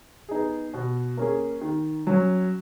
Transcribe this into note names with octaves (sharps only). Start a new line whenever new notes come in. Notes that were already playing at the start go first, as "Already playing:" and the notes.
B3 D#4 G#4
B2
A#3 C#4 G#4
D#3
F#3 C#4